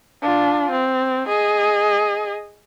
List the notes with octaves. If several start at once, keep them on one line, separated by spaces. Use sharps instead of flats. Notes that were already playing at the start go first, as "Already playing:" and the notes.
D4 F4
C4
G#4 D#5